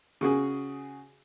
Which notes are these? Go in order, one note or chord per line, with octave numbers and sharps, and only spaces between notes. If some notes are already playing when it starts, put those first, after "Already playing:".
C#3 F#4 G#4